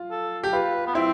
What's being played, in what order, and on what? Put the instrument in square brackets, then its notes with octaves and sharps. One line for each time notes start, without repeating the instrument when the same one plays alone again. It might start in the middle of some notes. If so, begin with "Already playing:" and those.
Already playing: [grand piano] F4
[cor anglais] A4
[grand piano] G4
[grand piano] F4 [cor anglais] B4
[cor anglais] B3
[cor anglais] C4 [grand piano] E4